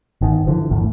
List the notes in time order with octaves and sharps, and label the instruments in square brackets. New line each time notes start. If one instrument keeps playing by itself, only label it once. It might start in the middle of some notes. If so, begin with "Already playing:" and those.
[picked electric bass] G1 D#3
D3 E3 F3
G#1 E2 A2